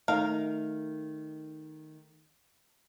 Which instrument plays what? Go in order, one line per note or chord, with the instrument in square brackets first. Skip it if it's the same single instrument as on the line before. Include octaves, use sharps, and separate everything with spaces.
[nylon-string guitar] D#3 A3 D#4 [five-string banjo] A#4 F5